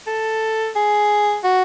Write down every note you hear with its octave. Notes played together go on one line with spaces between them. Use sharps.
A4
G#4
F#4